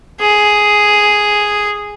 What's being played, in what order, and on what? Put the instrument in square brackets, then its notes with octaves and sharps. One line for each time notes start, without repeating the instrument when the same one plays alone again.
[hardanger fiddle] G#4